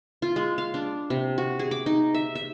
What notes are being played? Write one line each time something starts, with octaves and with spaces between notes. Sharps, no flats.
F4
G#3
F5
D4
C3
F#4
G#4
D6
D#4
E5
E5